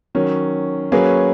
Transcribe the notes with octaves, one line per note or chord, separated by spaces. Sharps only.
D#3 F#3 C#4
F#3 A#3 C#4 G#4 B4